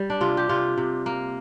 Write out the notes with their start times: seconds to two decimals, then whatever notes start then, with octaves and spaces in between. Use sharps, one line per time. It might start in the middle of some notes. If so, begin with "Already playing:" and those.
Already playing: G3
0.10 D4
0.21 C3 F4
0.37 G4
0.49 C3 F4
0.78 C3
1.06 A#3